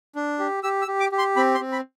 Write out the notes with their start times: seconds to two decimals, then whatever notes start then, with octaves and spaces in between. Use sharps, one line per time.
0.16 D4
0.39 G4
0.63 G4 E6
0.82 E6
0.88 G4
1.00 D6
1.12 G4
1.18 C6
1.36 C4 B5
1.55 C6
1.60 C4
1.72 B5